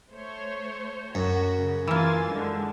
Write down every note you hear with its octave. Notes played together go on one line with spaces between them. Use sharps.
A3 C5 C#5
F#2 F#4
C#3
E3 A#3 F4 G#5 A6
D3 G#3